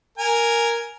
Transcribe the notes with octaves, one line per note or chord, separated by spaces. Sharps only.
A#4 G#5